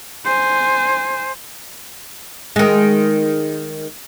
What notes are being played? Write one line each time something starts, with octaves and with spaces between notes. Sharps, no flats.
C5 G#5
D#3 G#3